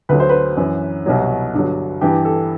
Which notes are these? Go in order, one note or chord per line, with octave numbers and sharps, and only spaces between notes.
D2 D3 F#3 B4
C5
B4
F#2 E3
C2 B2 F#3
G2 D3 F#3
G2 E3 G4
A4